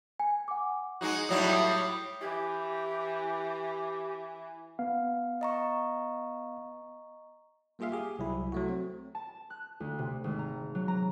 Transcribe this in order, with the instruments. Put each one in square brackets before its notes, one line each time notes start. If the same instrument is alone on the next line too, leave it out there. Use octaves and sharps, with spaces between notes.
[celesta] G#5
F#5 D6
[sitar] G#3 D#4 F#4
[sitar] A2 F#3 G3 [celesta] D#6
[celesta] D#6
[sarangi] E3 [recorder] G4
[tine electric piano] B3 F5
[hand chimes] D#5 A#5 C#6
[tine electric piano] G3 A#3 F4 G#4 E5 F5
G4 G#4
C2 F#3 E4
F#3 A3 F#4
C4
[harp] A5
F#6
D2
C3
G#1
A#5
F#3
A#5